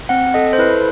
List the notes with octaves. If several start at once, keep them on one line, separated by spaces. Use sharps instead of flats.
C4 F#5
A4 D#5
C5
E4 B4